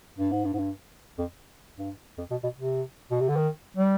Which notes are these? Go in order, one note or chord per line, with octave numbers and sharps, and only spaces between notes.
G2
G#2
G2
G#2
G2
F2
G2
F2
B2
B2
C3
B2
C3
D3
D#3
G3